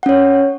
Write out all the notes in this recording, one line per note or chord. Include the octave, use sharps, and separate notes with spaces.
C#4 C#5 F#5